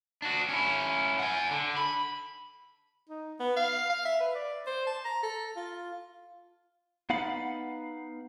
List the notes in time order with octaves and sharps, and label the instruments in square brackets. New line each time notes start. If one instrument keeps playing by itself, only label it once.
[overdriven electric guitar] D4 F#4
C#4 E4
F#5 G#5
D3
B5
[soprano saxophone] D#4
B3
F5
F5
E5
B4
D5
C5
A5
A#5
A4
F4
[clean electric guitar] B3 D#4 F5 F#5 B5